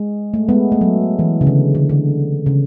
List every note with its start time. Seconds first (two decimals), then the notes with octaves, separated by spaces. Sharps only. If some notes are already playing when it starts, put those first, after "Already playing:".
Already playing: G#3
0.34 A3
0.49 G#3 B3
0.72 A3
0.81 F#3
1.19 E3
1.41 C#3
1.47 D3
1.75 D3
1.89 D3
2.46 C#3